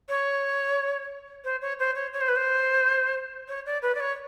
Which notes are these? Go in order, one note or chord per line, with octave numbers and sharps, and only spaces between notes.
C#5
C5
C#5
C5
C#5
C#5
C5
B4
C5
C#5
D5
B4
D5
C#5